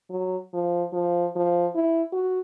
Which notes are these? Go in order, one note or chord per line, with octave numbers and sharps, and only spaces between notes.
F#3
F3
F3
F3
E4
F#4